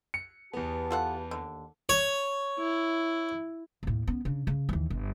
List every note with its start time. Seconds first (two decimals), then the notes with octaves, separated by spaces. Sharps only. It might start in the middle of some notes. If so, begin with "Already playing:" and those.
0.14 C#7
0.53 E2 B3 G4 B4 A5
0.91 F4 A4 F#5
1.31 D#2 D3
1.89 C#5
2.59 E4
3.83 D#2 A2
4.07 B3 C#4
4.25 C#3 D4
4.47 C#3
4.69 D#2 E3
4.90 G1